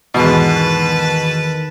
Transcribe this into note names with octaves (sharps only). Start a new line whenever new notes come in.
E2 G#2 B2 D#3 B4 A5